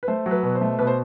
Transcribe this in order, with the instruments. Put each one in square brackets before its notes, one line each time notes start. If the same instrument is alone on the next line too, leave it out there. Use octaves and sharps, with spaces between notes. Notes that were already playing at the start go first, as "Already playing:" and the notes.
[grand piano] B4
A3 C5
F#3
B4
B2
C5
A3
B2 B4
C5